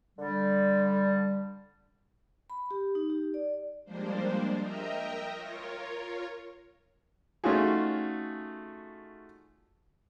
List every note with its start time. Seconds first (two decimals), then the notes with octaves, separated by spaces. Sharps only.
0.19 D3 G3
2.50 B5
2.71 G4
2.95 D#4
3.10 G4
3.34 D5
3.85 F3 G3 G#3 A#3 D4 C5
4.60 A#4 D#5 E5 G5 A#5
5.34 F4 A#4 C#5
7.44 A3 C#4 D#4 F4 F#4 G#4